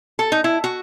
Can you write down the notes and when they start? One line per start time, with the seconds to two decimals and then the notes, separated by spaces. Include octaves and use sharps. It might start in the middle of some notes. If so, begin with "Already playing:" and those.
0.19 A4
0.32 D#4
0.44 E4
0.64 F#4